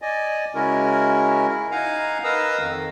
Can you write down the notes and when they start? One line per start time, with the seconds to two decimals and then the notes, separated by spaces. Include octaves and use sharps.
0.02 D5 D#5 G#5
0.55 C#3 G#3 C#4 E4 F#4 A#4
1.48 E4
1.71 D#4 F5 F#5 G#5 A#5
2.24 A#4 B4 D#5 F5 D#6 E6
2.60 F2 D#3